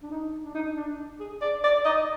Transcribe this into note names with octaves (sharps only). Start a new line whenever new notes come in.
D4
D#4
D4
D#4
D4
G#4
D5
D5
D#5